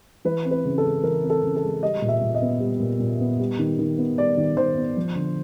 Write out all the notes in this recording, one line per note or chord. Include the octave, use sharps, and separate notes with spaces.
E3 B4
C4
B4
C#3
A4
G#3
E3 A#4
C4
A4
C#3
A4
G#3
G3 D#5
A#2
E5
A#2
D#5
B3
G3
A#2
A#2
B3
G3
D#3
D#3
B3
G3 D5
D#3
D#3 C5
B3
F3
D3